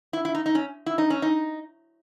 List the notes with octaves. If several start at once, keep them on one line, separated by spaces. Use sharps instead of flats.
E4
E4
D#4
D#4
C#4
E4
D#4
C#4
D#4